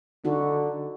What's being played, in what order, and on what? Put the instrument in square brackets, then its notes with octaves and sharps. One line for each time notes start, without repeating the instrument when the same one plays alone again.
[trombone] D3 [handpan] D#4 F#4